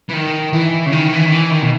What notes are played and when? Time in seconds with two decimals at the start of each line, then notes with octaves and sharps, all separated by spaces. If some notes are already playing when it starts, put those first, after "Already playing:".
0.09 E3
0.14 D#3
0.53 E3
0.86 C#3
0.93 D#3
1.13 E3
1.26 D#3
1.33 E3
1.51 D#3
1.62 B2